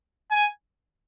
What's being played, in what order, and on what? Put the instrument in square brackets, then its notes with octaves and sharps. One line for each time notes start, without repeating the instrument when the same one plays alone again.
[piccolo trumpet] G#5